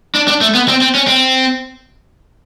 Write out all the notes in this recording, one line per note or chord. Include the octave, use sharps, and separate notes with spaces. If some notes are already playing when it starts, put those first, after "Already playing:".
D4
D4
A3
B3
C4
C4
C#4
C4